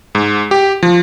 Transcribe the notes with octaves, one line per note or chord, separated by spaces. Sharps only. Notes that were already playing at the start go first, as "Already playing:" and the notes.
G#2
G4
F3